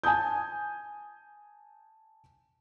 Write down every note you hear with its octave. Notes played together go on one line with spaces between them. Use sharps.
G#5 A5 D#6 G6